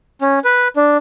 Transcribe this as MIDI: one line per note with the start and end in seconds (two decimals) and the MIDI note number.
0.21 0.39 61
0.45 0.68 71
0.76 0.97 62